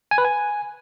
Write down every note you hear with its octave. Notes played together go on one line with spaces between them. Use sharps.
G#5
B4
G#5